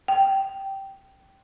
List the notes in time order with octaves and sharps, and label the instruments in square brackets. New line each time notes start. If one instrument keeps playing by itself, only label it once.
[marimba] G5